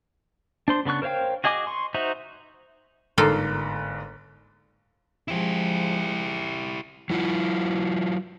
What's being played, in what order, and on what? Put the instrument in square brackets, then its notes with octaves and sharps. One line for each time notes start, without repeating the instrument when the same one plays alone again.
[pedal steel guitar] D4 C5 C6
C#3 B3 D4 C#6 F#6
A#4 C5 C#5 F5 G5
F#4 G#4 D#5 G#5 D6
C6 C#6
D#4 F#4 C5 E5 A#5
[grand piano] G1 G#2 [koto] A#3 F4 A4
[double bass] F3 G#3 [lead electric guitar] E4 G4
[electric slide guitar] F#3 E4 F4